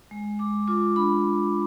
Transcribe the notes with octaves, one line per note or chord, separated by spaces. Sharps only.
G#3
G#3 D6
F4 D6
D4 B5